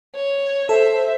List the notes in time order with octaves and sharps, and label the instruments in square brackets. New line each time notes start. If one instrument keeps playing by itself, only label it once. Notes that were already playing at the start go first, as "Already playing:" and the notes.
[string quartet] C#5
[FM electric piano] A4 [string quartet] C5 E5